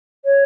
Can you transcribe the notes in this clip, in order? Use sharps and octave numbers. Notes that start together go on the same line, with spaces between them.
C#5